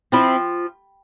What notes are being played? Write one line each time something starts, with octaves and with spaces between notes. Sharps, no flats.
F3 C4 E4